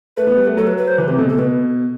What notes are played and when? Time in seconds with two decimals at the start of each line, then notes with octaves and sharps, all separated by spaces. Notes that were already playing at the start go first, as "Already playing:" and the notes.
0.17 A3 B4
0.27 B3
0.37 G3
0.47 A3
0.57 F#3 A4
0.67 B4
0.77 B4
0.88 C5
0.98 E3 B4
1.08 C3 G4
1.18 B2 A4
1.29 B2 A4
1.39 B2 B4